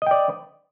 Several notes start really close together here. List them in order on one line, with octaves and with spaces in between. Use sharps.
D#5 G5 D5